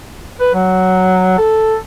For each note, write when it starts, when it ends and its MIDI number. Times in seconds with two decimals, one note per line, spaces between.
0.40 0.50 71
0.54 1.38 54
1.38 1.76 69